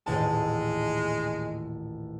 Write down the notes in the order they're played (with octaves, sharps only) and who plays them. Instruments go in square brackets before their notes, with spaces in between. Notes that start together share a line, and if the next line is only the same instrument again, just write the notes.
[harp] D#1 A1 A5 [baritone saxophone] G#3